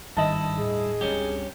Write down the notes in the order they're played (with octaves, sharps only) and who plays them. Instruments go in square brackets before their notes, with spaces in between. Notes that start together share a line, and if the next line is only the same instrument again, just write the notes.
[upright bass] G#1 D#3 [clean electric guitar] G2 E4 [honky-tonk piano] D#5 A5
[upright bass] D#2 A2 [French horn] G#4
[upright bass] C#2 C4 [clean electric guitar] G2 C#4 G4